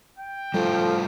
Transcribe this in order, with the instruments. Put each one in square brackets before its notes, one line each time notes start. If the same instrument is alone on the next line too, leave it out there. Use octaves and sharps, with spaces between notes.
[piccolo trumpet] G5
[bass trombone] F3 [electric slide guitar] G3 A3 F4 [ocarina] A4